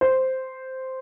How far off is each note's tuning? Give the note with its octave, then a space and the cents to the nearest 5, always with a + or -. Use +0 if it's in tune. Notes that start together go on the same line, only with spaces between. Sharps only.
C5 -5